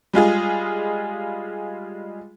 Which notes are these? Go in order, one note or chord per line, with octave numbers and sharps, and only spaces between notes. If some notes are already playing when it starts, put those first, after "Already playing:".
G3 G#3 F4 G#4